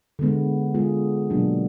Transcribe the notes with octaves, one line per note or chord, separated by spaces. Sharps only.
D3 G#3 B3
G#3 B3 F4 G#4
B2 F#3 A#3 D4 F#4